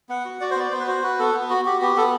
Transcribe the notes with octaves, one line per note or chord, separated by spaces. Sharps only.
B3 F#5
F#4
F#4 D5
C5
B3 D5
B3 C5
B4
F#4 C5
F#4 B4
B3 A4
B3
F#4
F#4 G4
B3 G4
B3 A4